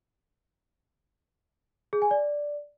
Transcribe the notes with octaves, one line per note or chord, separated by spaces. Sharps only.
G#4
G#5
D5